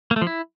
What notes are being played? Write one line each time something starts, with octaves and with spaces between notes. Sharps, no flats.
A#3
A3
F3
E4